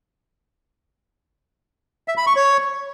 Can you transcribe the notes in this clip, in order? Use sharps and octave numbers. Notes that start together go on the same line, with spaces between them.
E5
B5
C#6
C#5